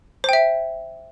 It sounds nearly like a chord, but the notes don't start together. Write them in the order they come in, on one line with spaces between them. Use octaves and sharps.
C5 G5 E5